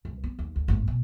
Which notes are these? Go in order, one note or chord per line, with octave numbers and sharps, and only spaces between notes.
C2
B3
D#2
D2
G#1 A2
B2